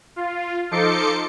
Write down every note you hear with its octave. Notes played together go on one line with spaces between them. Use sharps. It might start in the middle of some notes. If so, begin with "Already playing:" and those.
F4
F3 D#4 A4 C6 D6 C#7